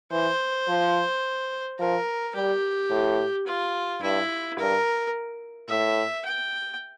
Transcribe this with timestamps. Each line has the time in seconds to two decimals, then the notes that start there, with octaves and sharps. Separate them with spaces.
0.12 E3 C5
0.68 F3
1.79 F3 A#4
2.35 G3 G4
2.91 A2
3.47 F4
4.02 G2 E4
4.58 G2 A#4
5.69 A2 E5
6.25 G5